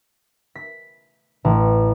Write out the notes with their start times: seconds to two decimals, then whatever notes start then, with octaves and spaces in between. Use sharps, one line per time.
0.55 B6
1.45 A1